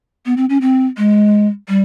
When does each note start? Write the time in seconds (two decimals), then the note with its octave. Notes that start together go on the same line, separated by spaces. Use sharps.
0.26 B3
0.37 C4
0.50 C#4
0.61 C4
0.97 G#3
1.68 G3